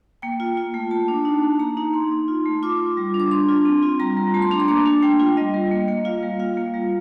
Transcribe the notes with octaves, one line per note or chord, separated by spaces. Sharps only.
A#3 G5
F4
F4
A3
A#3 A5
D4
D#4
A#3
A#3 A#5
D#4
D#4 C6
D#4
F4
A3
F4 D6
F4
G3
D4
D6
D4 C6
F4
C4
F4
G3 A#5
G3
A3 A5
C6
D4 A#5
C6
A#3 D6
D4
A3 G5
F4
G3 D#5
G3
A#3
A#3
F4 F5
G3
F4 F5
A#3
G3